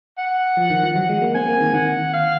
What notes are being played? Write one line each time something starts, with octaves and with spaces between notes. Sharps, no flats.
F#5
F3
D#3
F3
F#3 F#5
G#3
A#3
C4 G#5
A#3
D#3
D#3 F#5
F5